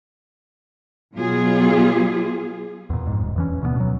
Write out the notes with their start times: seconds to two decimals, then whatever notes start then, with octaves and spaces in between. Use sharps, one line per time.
1.13 B2 F#3 F4 G#4
2.90 E2 A#2
3.07 F2 G#2
3.22 D#1
3.36 E2 E3 C#4
3.62 D2 B2 G#3 B3
3.76 B2 F#3